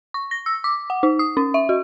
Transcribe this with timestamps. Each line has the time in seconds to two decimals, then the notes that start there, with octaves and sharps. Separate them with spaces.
0.14 C#6
0.31 A#6
0.46 E6
0.64 D6
0.90 F#5
1.03 D#4
1.19 D#6
1.37 C#4
1.54 E5
1.69 F#4